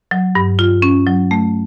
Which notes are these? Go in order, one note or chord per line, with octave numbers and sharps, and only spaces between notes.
F#3
G2
F4
C#4
F#3
A3